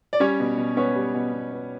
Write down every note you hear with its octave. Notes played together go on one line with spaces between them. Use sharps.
D5
G3 C#4 C#5
B2
B2
B3 C#4 C#5
G3
B2
B2
B3